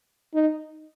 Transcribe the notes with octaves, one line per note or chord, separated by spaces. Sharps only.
D#4